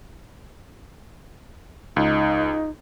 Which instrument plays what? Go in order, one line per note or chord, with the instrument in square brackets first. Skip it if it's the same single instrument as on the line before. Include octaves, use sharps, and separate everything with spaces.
[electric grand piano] C#2 [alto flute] D#4